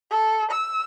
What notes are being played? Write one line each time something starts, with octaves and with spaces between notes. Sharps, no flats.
A4
E6